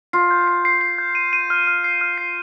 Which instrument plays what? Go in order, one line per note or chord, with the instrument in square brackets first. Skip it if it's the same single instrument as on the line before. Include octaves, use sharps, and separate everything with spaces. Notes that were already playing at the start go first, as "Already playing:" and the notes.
[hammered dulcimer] F4 [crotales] C7
[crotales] G6
C7
C7
C7
G6
D#7
D#7
F6
F6
C7
F6
C7